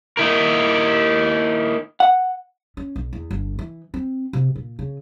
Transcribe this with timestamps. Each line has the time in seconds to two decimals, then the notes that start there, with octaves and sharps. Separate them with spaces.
0.17 A#3 D#4 E4 A#4
2.00 F#5
2.77 C#4
2.96 B1
3.13 E2
3.31 G1
3.59 E3
3.94 C4
4.33 C3
4.55 A#2
4.79 C#3